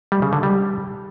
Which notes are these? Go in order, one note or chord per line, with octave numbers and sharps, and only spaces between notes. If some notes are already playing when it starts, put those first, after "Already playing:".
G3
C#3
D3
G3